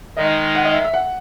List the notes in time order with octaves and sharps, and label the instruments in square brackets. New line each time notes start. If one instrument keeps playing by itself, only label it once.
[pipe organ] D#3 G#3 D#4 [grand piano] D#5
[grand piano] F#5
D#5
E5
E5
F#5